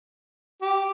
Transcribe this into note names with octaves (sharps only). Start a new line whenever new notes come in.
G4